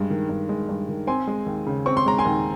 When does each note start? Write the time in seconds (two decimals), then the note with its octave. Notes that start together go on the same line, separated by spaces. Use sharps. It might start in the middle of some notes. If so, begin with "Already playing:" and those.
Already playing: G2 G#3
0.10 D#3
0.29 G2
0.49 G#3
0.69 G2
0.89 D#3
1.07 C4 G#5 C6
1.27 G#3
1.46 D#2
1.66 C#3
1.86 C4 C#6
1.97 C6
2.06 G#3 A#5
2.18 G#5 C6
2.25 D#2